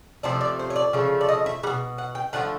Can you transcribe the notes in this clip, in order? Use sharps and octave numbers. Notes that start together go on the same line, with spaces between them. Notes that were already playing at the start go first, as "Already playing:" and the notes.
C3 F3 A3 D5
D5
C5
C#5
D5
C#3 F3 A3
D5
D#5
E5
B2 G3 F#5
F#5
G5
D3 F3 A3 F#5